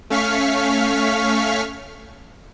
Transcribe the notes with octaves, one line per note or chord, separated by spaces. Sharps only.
A3 C#4 F5 C#6 F6 B6